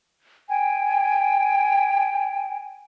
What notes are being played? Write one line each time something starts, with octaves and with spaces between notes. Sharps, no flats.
G5 G#5